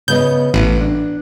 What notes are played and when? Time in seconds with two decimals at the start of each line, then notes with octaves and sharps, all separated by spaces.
0.08 C#3 B3 D#5 G6
0.54 A1 B3
0.80 D4